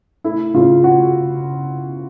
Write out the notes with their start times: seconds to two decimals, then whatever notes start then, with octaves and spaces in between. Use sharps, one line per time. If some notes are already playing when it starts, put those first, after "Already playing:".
0.24 A3 E4
0.54 C#3 F4
0.84 C#3 F#4